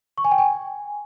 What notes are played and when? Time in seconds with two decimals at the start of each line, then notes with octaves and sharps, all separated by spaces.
0.18 C#6
0.25 G#5
0.31 G5
0.38 G#5